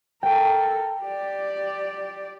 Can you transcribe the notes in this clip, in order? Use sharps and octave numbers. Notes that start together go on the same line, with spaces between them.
A4 A#4 G5
G4 D5